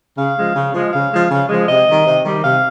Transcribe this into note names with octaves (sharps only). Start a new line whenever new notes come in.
C#3 F5
F3 G#3
C#3
F3 G#3
C#3 F5
F3 G#3
C#3
F3 G#3
C3 D#5
D#3 G3
C3
D#3 G3
C3 F5